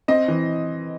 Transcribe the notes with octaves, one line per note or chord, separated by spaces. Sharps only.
C4 D#5
E3